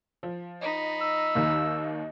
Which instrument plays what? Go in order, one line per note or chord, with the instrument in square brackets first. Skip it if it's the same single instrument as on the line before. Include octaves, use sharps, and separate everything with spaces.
[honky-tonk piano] F3
[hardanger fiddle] D#4 B5 [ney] D#5
[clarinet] E6
[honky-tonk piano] D#2 D#3 A#3